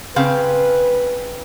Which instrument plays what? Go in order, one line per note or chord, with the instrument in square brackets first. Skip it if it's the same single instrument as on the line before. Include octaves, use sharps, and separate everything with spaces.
[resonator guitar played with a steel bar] C#3 C4 F5 [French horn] B4